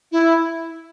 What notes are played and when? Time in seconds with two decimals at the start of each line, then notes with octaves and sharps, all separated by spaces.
0.12 E4